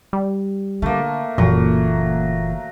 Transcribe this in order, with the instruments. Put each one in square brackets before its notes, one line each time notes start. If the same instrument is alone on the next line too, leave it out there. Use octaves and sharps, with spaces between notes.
[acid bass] G3
[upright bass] D3 [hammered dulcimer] A3 A#3
[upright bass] F#1 E3 [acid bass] A#2 [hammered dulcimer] F#3